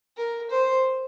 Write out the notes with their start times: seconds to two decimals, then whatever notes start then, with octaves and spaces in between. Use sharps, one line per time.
0.17 A#4
0.51 C5